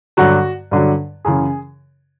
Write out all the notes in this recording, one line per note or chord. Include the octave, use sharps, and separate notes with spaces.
G2 D3 F#3 F#4
G2 D3 F#3
F#2 C#3 E3 G#4